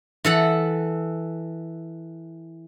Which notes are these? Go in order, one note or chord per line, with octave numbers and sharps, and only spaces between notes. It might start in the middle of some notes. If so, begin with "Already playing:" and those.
E3 A4 F#5